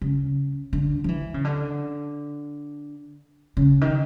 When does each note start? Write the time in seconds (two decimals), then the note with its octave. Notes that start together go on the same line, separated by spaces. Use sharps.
0.01 C#3
0.73 D3
1.04 F3
1.08 E3
1.34 C#3
1.45 D3
3.57 C#3
3.81 D#3